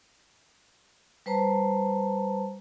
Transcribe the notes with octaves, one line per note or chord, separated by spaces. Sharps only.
G3 B4 C5 A5 A#5